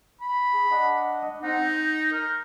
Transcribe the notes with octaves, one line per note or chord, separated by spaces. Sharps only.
B5
G#4
D4 D#5 F#5
C4 D#4 F#5
G6
A#4